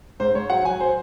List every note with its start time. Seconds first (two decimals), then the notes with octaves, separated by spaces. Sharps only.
0.20 G#2 C5
0.34 G#2 C#5
0.50 F#3 F#5
0.65 F#3 G#5
0.80 C5